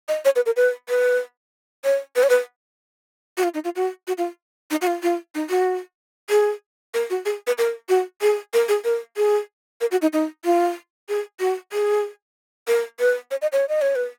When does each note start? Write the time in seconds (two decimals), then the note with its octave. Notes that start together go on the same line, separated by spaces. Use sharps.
0.08 D#5
0.25 C#5
0.36 B4
0.46 A#4
0.56 B4
0.89 B4
1.84 C#5
2.16 B4
2.23 C#5
2.30 B4
3.38 F#4
3.43 F4
3.54 D#4
3.64 F4
3.76 F#4
4.08 F#4
4.18 F4
4.71 D#4
4.82 F#4
4.87 F4
5.03 F4
5.35 D#4
5.50 F#4
6.30 G#4
6.94 A#4
7.10 F#4
7.25 G#4
7.47 B4
7.58 A#4
7.89 F#4
8.22 G#4
8.53 A#4
8.69 G#4
8.85 A#4
9.17 G#4
9.81 A#4
9.91 F#4
10.02 D#4
10.13 D#4
10.45 F4
11.09 G#4
11.40 F#4
11.73 G#4
12.68 A#4
12.99 B4
13.31 C#5
13.42 D#5
13.53 C#5
13.69 D#5
13.82 C#5
13.96 B4